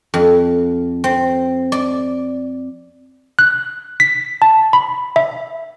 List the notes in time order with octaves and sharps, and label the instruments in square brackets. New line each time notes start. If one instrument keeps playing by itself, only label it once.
[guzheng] F2
C4
D5
[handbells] F#6
B6
A5
B5
E5